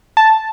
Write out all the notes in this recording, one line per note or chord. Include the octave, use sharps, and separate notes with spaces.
A5